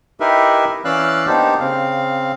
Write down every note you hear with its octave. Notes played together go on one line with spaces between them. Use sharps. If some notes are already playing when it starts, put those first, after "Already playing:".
D#4 E4 G4 A#4 B4 E5
E3 C#4 D5 F5 E6 F#6
A#3 B3 D4 D#4 G4 C5
C#3 C4 F5